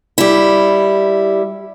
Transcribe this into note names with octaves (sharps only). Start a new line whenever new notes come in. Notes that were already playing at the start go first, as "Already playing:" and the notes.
G3 E4